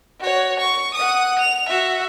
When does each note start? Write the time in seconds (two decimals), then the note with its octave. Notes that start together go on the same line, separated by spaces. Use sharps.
0.20 F#4 C#5
0.60 C#6
0.95 F#5 D#6
1.39 F7
1.69 F#4 E5